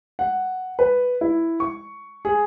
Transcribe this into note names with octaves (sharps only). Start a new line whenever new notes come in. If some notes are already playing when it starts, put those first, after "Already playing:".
F#5
B4
E4
C#6
G#4